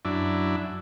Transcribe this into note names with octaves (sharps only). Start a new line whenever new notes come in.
F#2 D4 E4